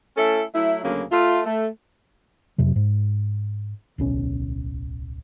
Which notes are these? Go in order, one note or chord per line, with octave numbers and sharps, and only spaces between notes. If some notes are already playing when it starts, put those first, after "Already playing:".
A3 C#4 E4 A4
F#3 A3 E4
D2 C#3 F#3 A#3 C#4
A3 F4
A3
F2 C3 F#3
G#2
D1 B1 C#4